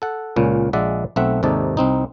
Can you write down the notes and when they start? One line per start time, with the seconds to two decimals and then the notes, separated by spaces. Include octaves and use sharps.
0.02 A4 F#5
0.36 C#2 A#2 C#4
0.73 A#1 G#3 D5 E5 F#5
1.16 B1 A3 C4 E5 F#5
1.43 D#2 G#2 C3 D#4 A4 D5
1.77 C2 C4 D#4